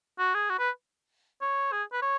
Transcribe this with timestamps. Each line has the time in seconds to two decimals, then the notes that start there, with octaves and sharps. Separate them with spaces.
0.19 F#4
0.34 G#4
0.50 F#4
0.59 B4
1.41 C#5
1.72 G#4
1.93 B4
2.02 C#5